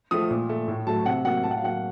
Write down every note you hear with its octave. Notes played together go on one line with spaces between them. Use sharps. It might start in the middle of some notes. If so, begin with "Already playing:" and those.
F3 A3 D#6
A#2
A3
A2
F#3 A3 A5
C3 F#5
F#3 A#3 F#5
A2 A5
F#5
F5
F#3 A#3 F#5